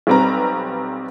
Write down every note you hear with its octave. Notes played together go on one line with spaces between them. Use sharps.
B1 G3 C4 B4 A#5